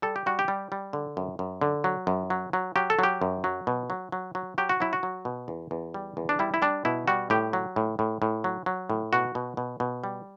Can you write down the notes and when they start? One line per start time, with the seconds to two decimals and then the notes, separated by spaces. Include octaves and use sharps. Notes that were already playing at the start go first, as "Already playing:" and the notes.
0.02 G3 A4
0.16 G4
0.26 G3 F#4
0.39 G4
0.48 G3
0.72 G3
0.93 D3
1.17 F#2
1.39 F#2
1.61 D3
1.84 F#3
2.07 F#2
2.30 F#3
2.53 F#3
2.76 F#3 G4
2.90 A4
2.99 F#3 G4
3.22 F#2
3.44 F#3
3.67 B2
3.90 F#3
4.12 F#3
4.35 F#3
4.58 F#3 G4
4.69 F#4
4.80 F#3 E4
4.93 F#4
5.03 F#3
5.25 B2
5.48 E2
5.71 E2
5.94 G3
6.17 E2
6.29 D4
6.39 G3 E4
6.54 E4
6.62 G3 D4
6.85 B2 E4
7.07 G3 F#4
7.30 A2 G4
7.53 F#3
7.76 A2
7.99 A2
8.22 A2
8.44 F#3
8.66 F#3
8.90 A2
9.13 B2 F#4
9.35 B2
9.57 B2
9.80 B2
10.04 G3